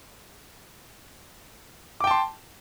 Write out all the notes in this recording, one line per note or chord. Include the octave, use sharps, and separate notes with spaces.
G5 A5 C6 D6